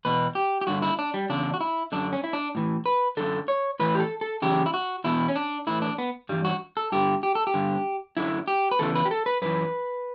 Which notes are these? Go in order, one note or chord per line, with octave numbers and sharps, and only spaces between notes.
E2 B2 B4
G4
G4
G2 D3 F#4
E4
D4
G3
E2 C#3 D4
F#4
E4
F#2 D3 D4
C#4
E4
D4
A2 E3
B4
F#2 D3 A4
C#5
A2 E3 B4
G4
A4
A4
F#2 C#3 E3 G4
E4
F#4
E2 B2 E4
C#4
D4
A2 E3 E4
D4
B3
G2 E3 G3
F#4
A4
G2 D3 G4
G4
A4
G4
G2 D3
F#2 D3 E4
G4
B4
E2 C#3 E3 A4
B4
G4
A4
B4
F#2 E3 B4